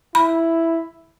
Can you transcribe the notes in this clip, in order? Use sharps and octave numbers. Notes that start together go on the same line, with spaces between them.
E4 B5